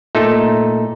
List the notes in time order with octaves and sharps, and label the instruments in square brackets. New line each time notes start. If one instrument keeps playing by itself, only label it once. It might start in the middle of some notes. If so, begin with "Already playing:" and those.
[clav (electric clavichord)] A#2 A3 D#4 A4